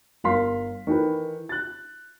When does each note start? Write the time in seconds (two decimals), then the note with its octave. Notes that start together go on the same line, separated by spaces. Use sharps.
0.24 G1 A#4 F5 C6 B6
0.87 D#3 E3 A4 B4
1.49 F#6 A6